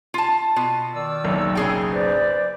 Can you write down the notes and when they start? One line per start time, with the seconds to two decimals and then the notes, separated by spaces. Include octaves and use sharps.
0.14 F4 A5
0.56 B2 F4
0.94 D#3 D5 E6
1.24 F#1 B1
1.55 C#3 G#4 G5
1.93 B4 C5 D5